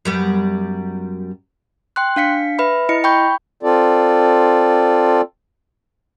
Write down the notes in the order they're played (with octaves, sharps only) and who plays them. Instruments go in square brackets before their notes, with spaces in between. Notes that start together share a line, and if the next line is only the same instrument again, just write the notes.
[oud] F#2 G3 B3
[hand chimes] G5 C6 F#6
D4 F5 B6 C#7
B4 E5 B5
E4 D#5 C#7
G5 B5 C#6 G6
[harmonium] C4 F4 A4 D5